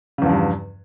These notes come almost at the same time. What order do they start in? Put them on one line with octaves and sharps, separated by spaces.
C#3 E2 F3 G2